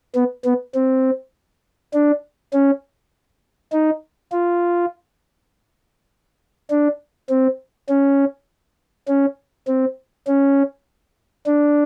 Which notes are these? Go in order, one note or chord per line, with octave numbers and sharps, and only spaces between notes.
B3
B3
C4
D4
C#4
D#4
F4
D4
C4
C#4
C#4
C4
C#4
D4